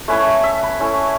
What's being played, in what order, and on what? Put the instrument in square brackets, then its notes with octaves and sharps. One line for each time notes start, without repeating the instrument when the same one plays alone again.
[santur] A3 C#4 E4 B4
E5
B5
A3 C#4 E4